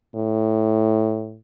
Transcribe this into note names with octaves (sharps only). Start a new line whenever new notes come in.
A2